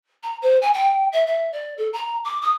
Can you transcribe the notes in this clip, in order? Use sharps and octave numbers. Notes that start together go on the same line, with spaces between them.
A#5
C5
G#5
G5
E5
E5
D5
A4
A#5
D6
D#6